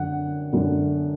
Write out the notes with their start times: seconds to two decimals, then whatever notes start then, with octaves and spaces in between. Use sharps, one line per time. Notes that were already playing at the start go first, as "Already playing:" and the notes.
Already playing: F#2 D3 F#5
0.53 F#2 D3